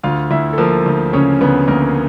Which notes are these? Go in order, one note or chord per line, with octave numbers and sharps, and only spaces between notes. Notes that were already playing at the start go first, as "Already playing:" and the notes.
D2 F4 F5
D2 E4 E5
A4
F3 A#3 A#4
D2
C#3 C#4 C#5
D2 B3 B4
D2 A#3 A#4